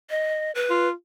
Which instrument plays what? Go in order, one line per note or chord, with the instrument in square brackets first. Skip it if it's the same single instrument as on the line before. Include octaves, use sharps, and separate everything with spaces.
[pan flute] D#5
B4
[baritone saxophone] F4